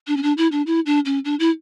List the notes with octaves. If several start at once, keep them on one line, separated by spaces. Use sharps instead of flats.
D4
C#4
D4
E4
D4
E4
D4
C#4
D4
E4